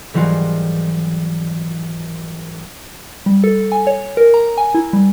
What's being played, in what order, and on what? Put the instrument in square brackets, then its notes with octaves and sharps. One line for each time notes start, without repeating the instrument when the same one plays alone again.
[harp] G#1 E3 F#3 G3 F4 F#5
[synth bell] G3
A4
G#5
C#5
A#4
A#5
G#5
E4
G3